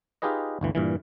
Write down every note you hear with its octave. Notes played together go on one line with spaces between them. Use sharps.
D#4 F4 G4 G#4 B4 D#5
G1 D2 E3
G2 A#2 E3